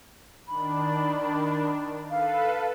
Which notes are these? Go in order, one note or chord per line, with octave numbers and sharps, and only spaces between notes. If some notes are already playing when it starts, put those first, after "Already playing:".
D#3 D4 B5
A4 B4 F5